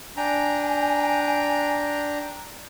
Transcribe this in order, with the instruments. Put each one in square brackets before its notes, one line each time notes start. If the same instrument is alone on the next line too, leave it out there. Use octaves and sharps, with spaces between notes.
[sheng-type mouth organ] D4 G5 A#5 [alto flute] G#5